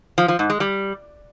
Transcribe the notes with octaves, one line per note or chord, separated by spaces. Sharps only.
F3
F3
G#2
G#3
G3